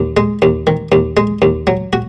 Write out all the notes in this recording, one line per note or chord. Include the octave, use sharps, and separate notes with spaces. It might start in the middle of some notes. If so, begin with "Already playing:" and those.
Already playing: D#2
G#3
D#2
D#3
D#2
G#3
D#2
F#3
F#4